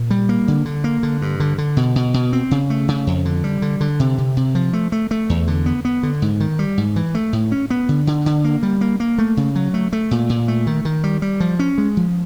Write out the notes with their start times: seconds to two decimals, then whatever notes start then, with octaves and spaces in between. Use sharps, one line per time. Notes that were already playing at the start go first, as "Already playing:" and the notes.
Already playing: A#2
0.11 G3
0.29 A#3
0.48 D3
0.65 D3
0.84 A#3
1.03 D3
1.22 G2
1.40 D3
1.58 D3
1.77 B2
1.96 B2
2.14 B2
2.33 C4
2.51 C#3
2.70 A3
2.88 C#3
3.07 F2
3.25 D3
3.44 G3
3.62 D3
3.81 D3
4.00 C3
4.18 C3
4.37 C3
4.55 F3
4.73 A3
4.92 A3
5.11 A3
5.30 E2
5.48 D3
5.66 B3
5.85 B3
6.03 D3
6.22 G#2
6.40 D#3
6.59 G3
6.78 G#2
6.96 E3
7.15 A3
7.33 A2
7.52 C#4
7.70 B3
7.89 D3
8.07 D3
8.26 D3
8.44 A#3
8.63 G3
8.81 A#3
9.00 A#3
9.18 A3
9.37 C#3
9.55 F#3
9.74 A3
9.93 A3
10.11 A#2
10.29 A#2
10.48 A3
10.67 D#3
10.85 D#3
11.04 G3
11.22 G3
11.40 F3
11.59 C#4
11.78 G#3
11.97 F3